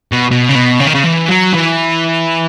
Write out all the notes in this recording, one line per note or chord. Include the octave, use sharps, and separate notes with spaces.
B2
B2
C#3
B2
C#3
D#3
C#3
E3
F#3
E3